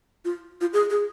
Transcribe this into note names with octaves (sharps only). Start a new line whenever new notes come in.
F4
F4
G#4
G#4